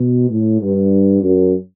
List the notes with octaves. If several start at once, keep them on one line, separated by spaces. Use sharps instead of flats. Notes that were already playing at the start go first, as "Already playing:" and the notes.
Already playing: B2
A2
G2
F#2